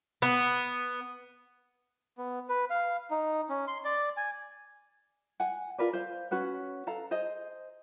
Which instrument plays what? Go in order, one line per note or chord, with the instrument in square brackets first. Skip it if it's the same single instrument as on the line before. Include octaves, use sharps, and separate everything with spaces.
[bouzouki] B3
[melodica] B3
B4
F5
D#4
C#4
C6
D5
G#5
[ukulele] F#5 G#5
F4 A#4 B4 D5
C5 F5
C#4 F#4 B4 F#5
A4 F5 A#5
G#4 C5 D#5